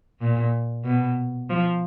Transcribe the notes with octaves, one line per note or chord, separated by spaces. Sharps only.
A#2
B2
F3